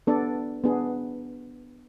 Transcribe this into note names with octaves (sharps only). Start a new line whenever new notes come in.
B3 D4 A4 D5
B3 D4 G#4